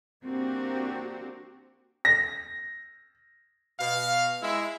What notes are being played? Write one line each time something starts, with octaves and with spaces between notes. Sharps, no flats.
A#3 C4 D4 F#4 G4
A#6
B2 F5
G#3 E4 E5